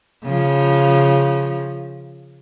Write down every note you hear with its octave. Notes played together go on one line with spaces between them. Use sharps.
C#3 F3